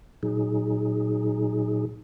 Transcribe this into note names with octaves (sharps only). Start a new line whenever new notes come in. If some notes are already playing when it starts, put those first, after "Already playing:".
A#2 F#3 D#4 G#4